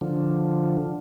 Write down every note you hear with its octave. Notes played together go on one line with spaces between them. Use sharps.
D3 F3